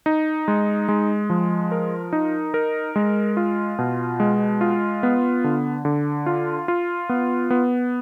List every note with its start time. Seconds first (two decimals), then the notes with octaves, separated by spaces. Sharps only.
0.06 D#4
0.48 G#3
0.89 G#3
1.30 F3
1.72 A#4
2.13 D#4
2.54 A#4
2.96 G#3
3.37 F4
3.79 B2
4.20 G#3
4.61 F4
5.03 B3
5.44 D3
5.85 D3
6.26 F4
6.68 F4
7.09 B3
7.50 B3